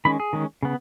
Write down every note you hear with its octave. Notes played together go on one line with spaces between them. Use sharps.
D#3 G#3 C#4 B5
G#4
D#3 G#3 C#4
C#3 B3